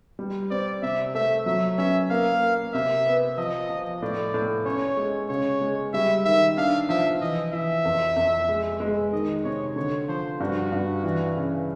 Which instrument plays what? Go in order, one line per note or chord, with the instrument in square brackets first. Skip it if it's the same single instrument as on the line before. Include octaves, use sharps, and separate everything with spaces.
[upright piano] G3
[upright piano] C4 [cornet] D5
[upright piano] C3 [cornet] E5
[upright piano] A3 [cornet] E5
[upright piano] F#3 [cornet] E5
[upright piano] C#4 [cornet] E5
[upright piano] A#3 [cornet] F5
[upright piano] A#3
[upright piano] C3 [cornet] E5
[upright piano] B3
[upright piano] F3 [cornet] D#5
[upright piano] F3
[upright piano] A2 [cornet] D5
[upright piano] A2
[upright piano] C#4 [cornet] C#5
[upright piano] G#3
[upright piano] C#3 [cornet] C#5
[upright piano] G#3
[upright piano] G3 [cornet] E5
[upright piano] D#3 [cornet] E5
[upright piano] D4 [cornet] F5
[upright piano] F3 [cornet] E5
[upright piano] E3 [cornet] D#5
[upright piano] E3 [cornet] E5
[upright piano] F2
F2
G#3
G#3
[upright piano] D#3 [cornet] D#5
[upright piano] C3 [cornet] C#5
[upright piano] D3 [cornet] C#5
[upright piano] F3 [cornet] C5
[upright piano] G2 [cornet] F#4
[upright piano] G2
E3
C#3